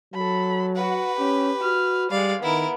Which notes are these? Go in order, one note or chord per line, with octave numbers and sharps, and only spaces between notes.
F#3 A4 B5
F#4 B4 F#5
C#4 G4
F#4 F6
G3 G#3 D5 F5
D#3 B3 E4 A#4